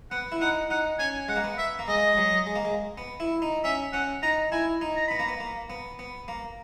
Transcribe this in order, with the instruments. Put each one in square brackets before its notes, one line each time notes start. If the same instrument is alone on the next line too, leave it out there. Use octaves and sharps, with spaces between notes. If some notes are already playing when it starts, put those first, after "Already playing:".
[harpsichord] B3 [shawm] F#5
[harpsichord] E4
[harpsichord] D#4 [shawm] F#5
[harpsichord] D#4 [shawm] F#5
[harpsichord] C#4 [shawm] G#5
[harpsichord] G#3 [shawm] F#5
[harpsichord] A#3
B3
[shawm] E5
[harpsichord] A#3
[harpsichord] G#3 [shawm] D#5
[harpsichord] G#3
F#3
G#3
A#3
G#3
B3
E4
D#4
[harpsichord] C#4 [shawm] E5
[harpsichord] C#4 [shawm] F#5
[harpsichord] D#4 [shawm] A#5
[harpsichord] E4 [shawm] G#5
[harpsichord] D#4
[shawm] A#5
[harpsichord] B3 [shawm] B5
[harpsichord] A#3 [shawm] A#5
[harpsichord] B3
A#3
B3
B3
A#3